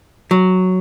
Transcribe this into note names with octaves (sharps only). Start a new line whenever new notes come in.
F#3